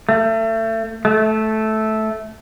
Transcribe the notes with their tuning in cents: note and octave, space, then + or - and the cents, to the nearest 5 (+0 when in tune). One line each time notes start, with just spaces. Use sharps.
A3 +30
A3 -10